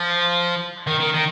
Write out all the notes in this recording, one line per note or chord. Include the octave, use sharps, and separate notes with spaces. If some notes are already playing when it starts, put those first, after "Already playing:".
Already playing: F3
D#3
D#3
D#3